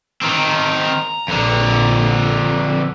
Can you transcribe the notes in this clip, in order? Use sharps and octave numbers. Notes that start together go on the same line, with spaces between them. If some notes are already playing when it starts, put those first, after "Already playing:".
D#3 C4 A#5
A#1 F2 D3